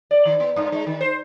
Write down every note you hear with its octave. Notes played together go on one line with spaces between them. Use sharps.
D5
D#3
B3
G2
G#3
D#3
C5